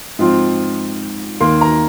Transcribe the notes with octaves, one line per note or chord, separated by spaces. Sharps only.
G#2 F3 C4 F4
D#2 D#3 A#3 C6
A#5